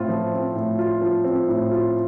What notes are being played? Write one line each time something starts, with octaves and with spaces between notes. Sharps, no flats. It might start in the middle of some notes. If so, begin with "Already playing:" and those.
Already playing: A2 C4 F4
F3
C4
A2
F4
F3
C4
A2
F4